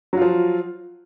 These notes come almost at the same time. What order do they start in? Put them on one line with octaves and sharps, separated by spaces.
F#3 F4 F3